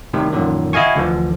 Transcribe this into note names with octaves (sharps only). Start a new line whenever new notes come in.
A2 C3 D#3 G3
A1 F#2 A#2 D3 D#3 F#3
E4 F#4 D#5 F5 G#5 C#6
D2 D3 E3 F3